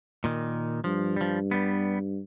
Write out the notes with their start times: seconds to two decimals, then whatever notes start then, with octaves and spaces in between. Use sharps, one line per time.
0.24 A#2 D#3
0.84 G2 F3
1.16 F3 G3
1.51 G3 B3